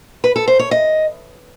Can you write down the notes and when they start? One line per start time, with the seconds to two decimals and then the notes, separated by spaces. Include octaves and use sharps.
0.24 B4
0.36 A4
0.48 C5
0.59 C#5
0.71 D#5